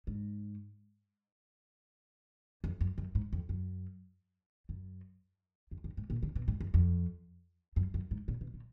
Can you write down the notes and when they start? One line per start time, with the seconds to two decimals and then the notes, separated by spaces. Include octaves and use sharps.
0.07 G#2
2.64 F2
2.81 F#2
2.98 F#2
3.15 G#2
3.33 F2
3.49 F#2
4.69 F#2
5.71 F2
5.84 F#2
5.97 G#2
6.10 A#2
6.23 D3
6.35 B2
6.48 G#2
6.61 F#2
6.74 F2
7.76 F#2
7.94 F#2
8.11 G#2
8.28 A#2
8.41 B2
8.54 A#2